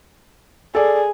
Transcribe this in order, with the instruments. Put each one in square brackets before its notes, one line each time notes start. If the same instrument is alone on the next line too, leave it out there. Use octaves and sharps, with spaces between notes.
[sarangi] G#4 [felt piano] A4 D5